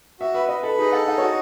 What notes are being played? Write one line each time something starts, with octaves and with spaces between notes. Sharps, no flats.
F#4 E5
B4 E5
B4 D#5
A4 B4
D#4 G#4
A4 F#5
D#4 F#5
F#4 C#5